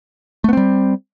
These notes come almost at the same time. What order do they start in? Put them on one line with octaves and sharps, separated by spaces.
A3 B3 C4 G3